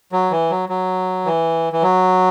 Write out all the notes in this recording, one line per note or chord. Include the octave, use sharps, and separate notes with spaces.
F#3
E3
F#3
F#3
E3
E3
F#3